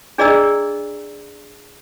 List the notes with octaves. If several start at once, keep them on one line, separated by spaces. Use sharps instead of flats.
D4 G#4 D5 D#5 A#5 E6